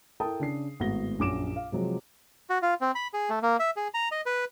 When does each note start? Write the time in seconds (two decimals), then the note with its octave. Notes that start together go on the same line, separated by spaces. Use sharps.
0.20 E4 A4 A#4 G5 A5 D#6
0.40 C#3 D4 C7
0.80 G#1 A2 B3 F#4 A#6 G7
1.19 A#1 F#2 F#3 D6 D7 E7
1.56 F5
1.72 C3 F3 F#3 G#3
2.50 F#4
2.62 F4
2.81 C4
2.95 B5
3.14 G#4
3.30 A3
3.42 A#3
3.59 E5
3.76 G#4
3.94 A#5
4.12 D#5
4.26 B4